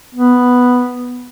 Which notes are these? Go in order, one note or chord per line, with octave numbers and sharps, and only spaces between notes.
B3